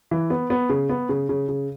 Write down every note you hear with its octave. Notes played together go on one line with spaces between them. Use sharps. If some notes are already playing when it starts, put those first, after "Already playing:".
E3
B3
B3
C#3
B3
C#3
C#3
C#3